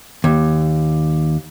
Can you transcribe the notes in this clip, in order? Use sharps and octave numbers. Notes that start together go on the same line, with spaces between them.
D#2